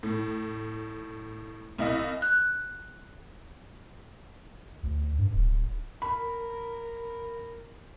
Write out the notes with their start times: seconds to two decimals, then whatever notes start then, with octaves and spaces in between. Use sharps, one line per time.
0.03 A2
1.78 C2 E4 D#5 F5
2.22 F#6
4.83 D2
5.18 G2
5.34 D1
6.02 A#4 B5